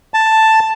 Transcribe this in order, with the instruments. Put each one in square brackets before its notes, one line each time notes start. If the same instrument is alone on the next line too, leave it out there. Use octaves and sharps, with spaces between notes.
[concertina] A5